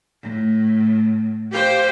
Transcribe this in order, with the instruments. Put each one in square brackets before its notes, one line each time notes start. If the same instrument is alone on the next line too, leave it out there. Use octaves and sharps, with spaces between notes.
[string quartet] A2
G4 C5 F5 G5